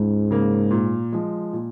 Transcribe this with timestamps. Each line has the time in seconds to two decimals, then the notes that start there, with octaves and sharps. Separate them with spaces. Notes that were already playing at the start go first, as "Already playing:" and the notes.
Already playing: C#2 G#2
0.31 C#3 A#3
0.71 A#2
1.12 F3 G#3
1.53 A#2